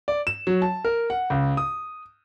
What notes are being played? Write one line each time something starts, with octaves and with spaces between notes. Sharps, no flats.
D5
E7
F#3
A5
A#4
F#5
C#2
D#6